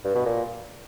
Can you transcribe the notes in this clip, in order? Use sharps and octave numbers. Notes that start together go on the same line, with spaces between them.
G2
B2
A#2